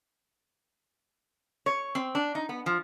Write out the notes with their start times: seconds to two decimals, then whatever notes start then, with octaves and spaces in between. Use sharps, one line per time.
1.66 C#5
1.95 C4
2.15 D4
2.35 D#4
2.49 B3
2.66 F3